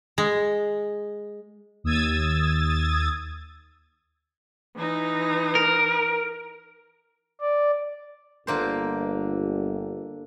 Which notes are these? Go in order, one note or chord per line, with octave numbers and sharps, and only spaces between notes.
G#3
D#2 D#6 E6 G#6 A6
E3 D#4
A#4
D5
G1 D3 A#3 C5